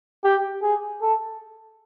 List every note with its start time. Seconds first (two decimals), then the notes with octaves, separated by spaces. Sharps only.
0.24 G4
0.63 G#4
1.02 A4